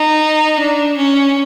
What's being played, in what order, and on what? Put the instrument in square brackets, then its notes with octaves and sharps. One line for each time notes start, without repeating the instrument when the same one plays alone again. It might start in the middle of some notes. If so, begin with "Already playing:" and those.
Already playing: [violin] D#4
D4
C#4